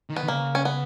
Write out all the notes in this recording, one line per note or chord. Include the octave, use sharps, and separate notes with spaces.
D#3
B3
D#3
C#3 A#3
C#4
B3